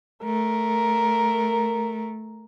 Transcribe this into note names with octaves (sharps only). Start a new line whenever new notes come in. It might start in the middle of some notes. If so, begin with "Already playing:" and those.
A3 A#4